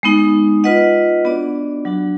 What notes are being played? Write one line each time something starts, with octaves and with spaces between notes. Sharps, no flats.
G#3 B3 D#4
F4 B4 D#5 F#5
B3 D4 F#4 D5
F#3 D4 F#4